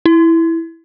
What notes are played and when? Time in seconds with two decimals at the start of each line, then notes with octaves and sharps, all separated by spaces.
0.06 E4